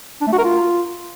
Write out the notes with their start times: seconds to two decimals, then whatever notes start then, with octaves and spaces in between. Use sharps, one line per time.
0.21 D4
0.27 A3
0.33 F#4
0.38 A#4
0.44 F4